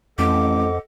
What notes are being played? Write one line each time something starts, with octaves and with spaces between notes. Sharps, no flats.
A1 F2 A4 D#5 F#5 D6